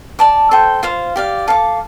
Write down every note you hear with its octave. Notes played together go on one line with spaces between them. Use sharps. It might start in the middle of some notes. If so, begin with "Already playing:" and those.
D5 A5 D6
A4 C5 G5
F4 C5 F5
G4 D5 F5
A4 F5 D6